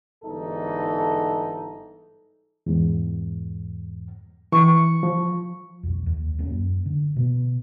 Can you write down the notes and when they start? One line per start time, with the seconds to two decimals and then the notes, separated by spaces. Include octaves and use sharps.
0.24 G1 G#2 E3 D#4 A4
2.66 E2 G#2
4.52 E3 C#6
5.03 F3
5.83 B1 F2
6.06 D#2
6.39 D#2 A#3 C#4
6.51 F#2
6.86 D3
7.17 B2 B3